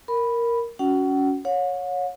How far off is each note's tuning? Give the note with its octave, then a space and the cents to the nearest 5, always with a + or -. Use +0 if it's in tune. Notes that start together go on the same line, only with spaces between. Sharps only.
A#4 +0 B5 +0
C#4 +20 F#4 +0 F#5 +35
C#5 +0 F#5 -45